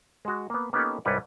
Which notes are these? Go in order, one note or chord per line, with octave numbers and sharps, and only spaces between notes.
G#3 F#4
A#3 B3
A#3 B3 C#4 D#4 G4 A4
C2 G#2 G3 B4 C#5 D5